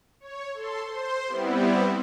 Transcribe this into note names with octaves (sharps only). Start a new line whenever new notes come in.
C#5
A4 C6
C5 C6
G3 B3 C4 E4